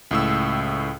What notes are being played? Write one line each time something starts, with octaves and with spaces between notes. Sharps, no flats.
C#2 A2 E6